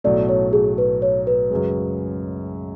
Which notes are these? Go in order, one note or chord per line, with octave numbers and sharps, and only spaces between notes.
B1 A2 F#3 A3 D5
C#5
G#4
B4
C#5
B4
F#2 C#3 G#3